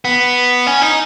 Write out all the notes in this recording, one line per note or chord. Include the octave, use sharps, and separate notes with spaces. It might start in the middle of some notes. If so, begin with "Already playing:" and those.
B3
C#4
D#4